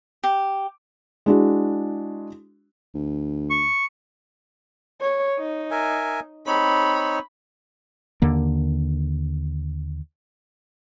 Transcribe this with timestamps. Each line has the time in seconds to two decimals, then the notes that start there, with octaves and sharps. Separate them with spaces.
0.24 G4
1.26 G#3 D4 E4 F#4
2.94 D2
3.50 C#6
5.01 C#5
5.39 D#4
5.71 A#4 E5 G#5
6.47 C4 D#4 C#5 B5
8.22 D#2 D3 A#3